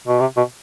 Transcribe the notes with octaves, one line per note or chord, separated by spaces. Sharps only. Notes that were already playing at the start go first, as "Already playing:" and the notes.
B2
C3
B2